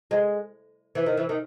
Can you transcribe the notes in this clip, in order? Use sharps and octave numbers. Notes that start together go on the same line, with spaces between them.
G#3
E3
D#3
E3
D#3